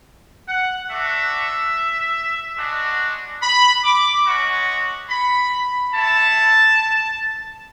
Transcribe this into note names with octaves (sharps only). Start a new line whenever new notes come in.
F#5
A3 D4 F#4 E5
G#3 D4 F#4
B5
D6
G#3 C#4 F#4 C#6
B5
A3 E4 A5